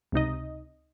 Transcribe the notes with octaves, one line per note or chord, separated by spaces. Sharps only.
C#2 C3 D#4 D#5